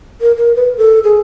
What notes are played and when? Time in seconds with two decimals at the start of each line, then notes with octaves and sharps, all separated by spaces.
0.21 A#4
0.37 A#4
0.56 B4
0.77 A4
1.04 G#4